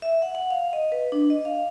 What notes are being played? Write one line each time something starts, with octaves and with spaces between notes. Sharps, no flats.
E5
F#5
F#5
F5
D#5
B4
D4
D#5
F5